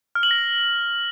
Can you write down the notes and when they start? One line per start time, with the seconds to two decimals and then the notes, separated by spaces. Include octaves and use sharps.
0.15 F6
0.23 F#7
0.31 A#6